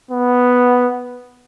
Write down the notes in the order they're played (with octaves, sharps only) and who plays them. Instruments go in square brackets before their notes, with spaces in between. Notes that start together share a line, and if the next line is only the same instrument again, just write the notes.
[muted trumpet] B3